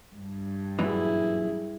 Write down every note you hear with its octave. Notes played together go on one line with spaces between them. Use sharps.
G2
F#2 A#2 E3 E4 G#4